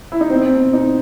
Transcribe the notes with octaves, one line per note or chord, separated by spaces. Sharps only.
E4
D#4
B2 C4
B2
B2 D#4